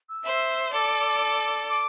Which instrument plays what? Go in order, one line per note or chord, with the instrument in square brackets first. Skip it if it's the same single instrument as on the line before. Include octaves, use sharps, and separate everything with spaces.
[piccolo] E6
[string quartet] C5 E5
[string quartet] A4 D5 [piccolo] D6
[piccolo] D6